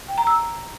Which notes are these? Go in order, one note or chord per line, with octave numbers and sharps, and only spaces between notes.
G5
A#5
E6